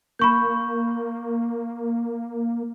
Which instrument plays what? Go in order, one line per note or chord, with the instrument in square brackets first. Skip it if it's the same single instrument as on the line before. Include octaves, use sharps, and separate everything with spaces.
[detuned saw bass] A#3 [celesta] B5 C#6 G6